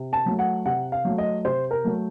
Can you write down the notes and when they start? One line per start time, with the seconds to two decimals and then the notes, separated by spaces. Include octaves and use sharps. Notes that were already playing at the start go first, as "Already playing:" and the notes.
Already playing: C3
0.13 A5
0.26 F#3 A3
0.39 F#5
0.66 C3 F#5
0.92 F5
1.05 F#3 A3
1.18 D#5
1.45 C3 C5
1.71 A#4
1.84 F#3 A3